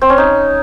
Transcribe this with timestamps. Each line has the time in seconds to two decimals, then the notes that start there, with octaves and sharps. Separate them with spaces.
0.02 C4
0.10 C#4
0.18 D#4